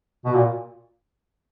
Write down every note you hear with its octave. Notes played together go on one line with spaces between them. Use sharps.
B2
A#2